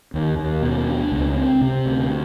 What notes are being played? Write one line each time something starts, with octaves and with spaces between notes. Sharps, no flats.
D#2
D#2
B2
D4
C#2
C4
C3
D2